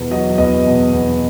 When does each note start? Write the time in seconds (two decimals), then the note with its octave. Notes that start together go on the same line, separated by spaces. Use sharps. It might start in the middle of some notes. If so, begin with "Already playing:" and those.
Already playing: E2 B2
0.11 F#3 D#5
0.38 E2 D#5
0.66 B2
0.93 E2